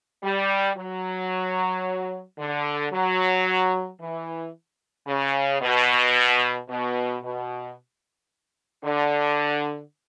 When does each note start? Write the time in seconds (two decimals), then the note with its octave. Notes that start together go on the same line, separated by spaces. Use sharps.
0.23 G3
0.77 F#3
2.38 D3
2.92 F#3
4.00 E3
5.08 C#3
5.61 B2
6.69 B2
7.23 B2
8.84 D3